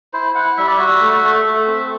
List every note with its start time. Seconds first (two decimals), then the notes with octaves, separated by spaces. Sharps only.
0.13 E4 C5
0.35 E4 F#5
0.57 G3 E5
0.67 D5
0.77 F#4 E5
1.01 A3
1.24 A3
1.45 A3
1.67 C4